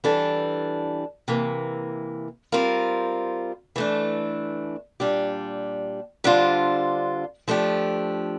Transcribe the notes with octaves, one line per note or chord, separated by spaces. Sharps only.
E3 G3 D4 A4
C3 E3 A#3
G3 C4 F4 A#4
E3 A3 D4
A#2 G3 D4 G4
D3 G3 D4 F4 C5
F3 A3 D4 G4